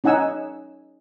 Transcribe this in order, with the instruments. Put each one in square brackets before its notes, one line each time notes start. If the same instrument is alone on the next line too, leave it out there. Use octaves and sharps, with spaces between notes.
[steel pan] C#4 D#4 F#5 G#5 E6